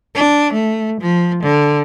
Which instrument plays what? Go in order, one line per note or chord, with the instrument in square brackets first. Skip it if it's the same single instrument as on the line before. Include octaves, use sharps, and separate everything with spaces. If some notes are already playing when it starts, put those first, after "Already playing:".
[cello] D4
A3
F3
D3